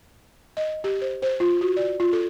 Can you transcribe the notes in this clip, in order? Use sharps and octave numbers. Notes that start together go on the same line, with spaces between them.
D#5
G4
C5
C5
F4
F#4
D5
F4
A4